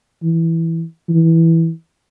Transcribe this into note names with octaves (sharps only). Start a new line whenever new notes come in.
E3
E3